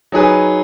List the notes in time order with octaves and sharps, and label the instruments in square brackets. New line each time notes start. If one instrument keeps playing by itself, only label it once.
[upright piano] F#3 D#4 G#4 B4